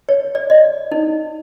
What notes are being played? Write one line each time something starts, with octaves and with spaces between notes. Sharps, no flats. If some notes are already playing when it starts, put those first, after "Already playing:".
C#5
D5
D#5
D#4